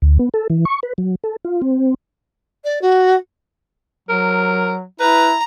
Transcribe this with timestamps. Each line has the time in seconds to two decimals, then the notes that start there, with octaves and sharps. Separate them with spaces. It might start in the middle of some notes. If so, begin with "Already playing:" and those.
0.02 D2
0.19 B3
0.34 A4
0.50 E3
0.65 C#6
0.83 B4
0.98 F#3
1.24 A4
1.45 F4
1.62 C4
2.64 D5
2.81 F#4
4.09 F#3 A#4
5.00 E4 B4 A#5